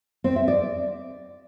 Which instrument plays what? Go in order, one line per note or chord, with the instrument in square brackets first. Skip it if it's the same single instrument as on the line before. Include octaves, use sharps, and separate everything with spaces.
[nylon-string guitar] C4
E5
D5